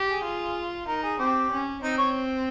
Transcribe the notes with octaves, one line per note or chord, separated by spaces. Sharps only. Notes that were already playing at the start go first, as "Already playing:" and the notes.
Already playing: G4
G#4
F4
D#4 A#4
G#4
C4 G4
C#4
C4 D#4
C#5